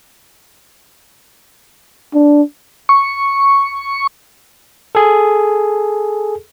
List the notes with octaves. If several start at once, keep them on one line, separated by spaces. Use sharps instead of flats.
D4
C#6
G#4 A4